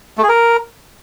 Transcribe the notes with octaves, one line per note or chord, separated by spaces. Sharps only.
A3
G#4
A#4